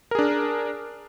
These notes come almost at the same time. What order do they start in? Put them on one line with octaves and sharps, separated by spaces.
A#4 G#4 D4